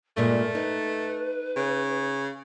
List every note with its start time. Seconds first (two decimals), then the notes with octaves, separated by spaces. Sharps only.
0.17 G2 A#2 G#3 A3 A#4
0.55 D#4 B4
1.56 C#3